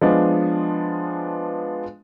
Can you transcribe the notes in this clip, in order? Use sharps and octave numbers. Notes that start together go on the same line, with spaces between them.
F3 G#3 B3 D4 F4